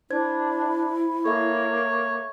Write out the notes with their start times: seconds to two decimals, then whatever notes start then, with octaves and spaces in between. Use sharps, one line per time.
0.10 D4 E4 C5 G#6
1.26 A#3 A4 C#5 E5